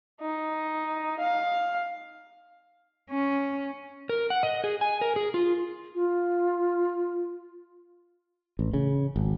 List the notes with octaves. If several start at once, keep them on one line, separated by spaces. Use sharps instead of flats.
D#4
F5
C#4
A#4
F#5
D#5
G#4
G#5
A#4
G#4
F4
F4
A1
C#3
G#1